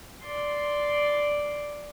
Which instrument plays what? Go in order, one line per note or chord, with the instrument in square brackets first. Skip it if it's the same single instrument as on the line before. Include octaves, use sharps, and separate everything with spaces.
[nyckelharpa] D5 C6